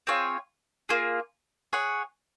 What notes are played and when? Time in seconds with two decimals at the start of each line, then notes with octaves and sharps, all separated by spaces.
0.07 C4 F4 G#4 C#5
0.89 A#3 F4 G#4
1.73 G#4 C#5 F#5